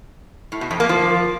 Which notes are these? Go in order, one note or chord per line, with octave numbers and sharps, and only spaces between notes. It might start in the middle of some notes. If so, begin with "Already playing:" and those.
A2
B2
F2
A#3
F3